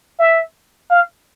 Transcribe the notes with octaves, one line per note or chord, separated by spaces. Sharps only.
E5
F5